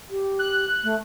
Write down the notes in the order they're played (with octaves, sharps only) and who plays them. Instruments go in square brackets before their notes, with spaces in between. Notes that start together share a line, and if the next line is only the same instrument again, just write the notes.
[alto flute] G4
[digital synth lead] F#6
[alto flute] A3